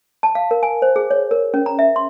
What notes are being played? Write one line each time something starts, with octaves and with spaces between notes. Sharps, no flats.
A5
F5
A#4
G#5
C5
G#4
C#5
A#4
C#4
A#5
E5
C6